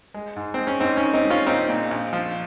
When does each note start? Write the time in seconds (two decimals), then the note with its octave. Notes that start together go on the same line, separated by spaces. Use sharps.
0.14 G#3
0.36 G#2
0.54 G#3 C4
0.67 C#4
0.80 G#2 C4 D#4
0.97 C#4
1.03 D#3
1.14 C4 D#4
1.25 G#3
1.30 C#4 F4
1.47 A#1 C4 D#4
1.69 A#2
1.91 A#1
2.13 F3